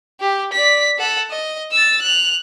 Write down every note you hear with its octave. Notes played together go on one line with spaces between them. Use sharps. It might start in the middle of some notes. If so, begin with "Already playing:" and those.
G4
D5 B6
A4 F#5
D#5
E6 A6
F#6 F7